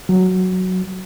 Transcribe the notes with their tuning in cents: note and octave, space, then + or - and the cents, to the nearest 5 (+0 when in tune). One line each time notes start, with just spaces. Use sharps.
F#3 +0